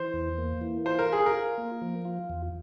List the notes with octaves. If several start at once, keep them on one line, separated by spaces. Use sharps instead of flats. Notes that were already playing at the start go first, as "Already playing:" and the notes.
Already playing: E3 C5
E2
A#3
E3
F4 C5
A#4
F4 G#4
A#4
F4
A#3
F3
F4
E2